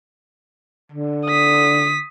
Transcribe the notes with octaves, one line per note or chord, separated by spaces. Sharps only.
D3
D#6 B6